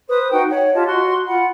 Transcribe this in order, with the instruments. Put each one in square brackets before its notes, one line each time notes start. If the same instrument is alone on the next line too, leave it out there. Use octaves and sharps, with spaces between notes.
[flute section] B4 C5 D#6
D#4 F#4 G5
C#5 F#5
F4 G4 D#5 A5
F#4 C6
F4 F#5 B5